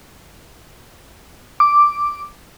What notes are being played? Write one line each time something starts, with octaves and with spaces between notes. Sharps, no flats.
D6